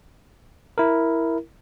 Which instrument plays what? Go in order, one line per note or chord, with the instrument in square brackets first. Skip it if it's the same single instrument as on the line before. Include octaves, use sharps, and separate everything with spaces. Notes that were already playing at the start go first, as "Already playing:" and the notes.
[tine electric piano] E4 A#4